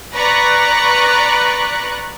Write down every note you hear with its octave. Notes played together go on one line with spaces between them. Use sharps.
B4 D5 A#5 C#6 F#6